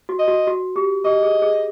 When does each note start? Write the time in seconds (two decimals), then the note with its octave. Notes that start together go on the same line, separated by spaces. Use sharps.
0.09 F#4
0.19 D#5
0.28 F#4
0.47 F#4
0.76 G4
1.04 G4 D#5
1.23 G#4
1.42 G#4